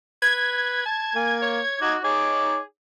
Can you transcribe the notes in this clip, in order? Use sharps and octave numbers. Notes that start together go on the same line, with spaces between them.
B4 G#6
A5
A#3 G#5
C#5
D#4 F#4 D6
D#4 G#4 C#5 D6